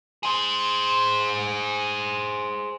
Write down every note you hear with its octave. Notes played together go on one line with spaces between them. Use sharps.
G#4 C5